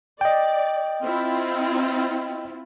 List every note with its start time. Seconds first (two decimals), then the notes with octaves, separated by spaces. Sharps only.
0.21 D5 D#5 G5
1.03 C4 E4 F4